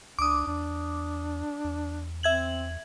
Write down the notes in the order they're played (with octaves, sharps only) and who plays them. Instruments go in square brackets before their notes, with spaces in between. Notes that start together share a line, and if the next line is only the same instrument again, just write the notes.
[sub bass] C#2 [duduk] D4 [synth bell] D6 D#6
[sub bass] E2 [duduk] D4
[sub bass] E2
[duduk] C4 [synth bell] E5 G#6 F#7